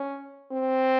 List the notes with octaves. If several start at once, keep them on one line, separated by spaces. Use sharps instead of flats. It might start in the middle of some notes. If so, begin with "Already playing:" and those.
Already playing: C#4
C4